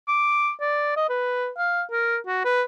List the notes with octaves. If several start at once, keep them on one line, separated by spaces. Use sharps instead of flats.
D6
D5
D#5
B4
F5
A#4
F#4
B4